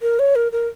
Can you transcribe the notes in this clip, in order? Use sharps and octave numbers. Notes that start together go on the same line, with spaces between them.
A#4
C#5
A#4
A#4